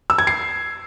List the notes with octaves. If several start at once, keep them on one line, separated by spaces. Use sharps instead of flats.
E6
G#6
C7